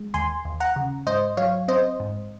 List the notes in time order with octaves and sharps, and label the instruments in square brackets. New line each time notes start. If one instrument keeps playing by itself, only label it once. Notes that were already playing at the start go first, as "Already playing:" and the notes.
Already playing: [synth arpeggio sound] G#3
D#2 G#5 C6
D#2
F#5 A#5
C#3
G#2 C5 D#5
F#3 C#5 F5
C4 C5 D#5
G#2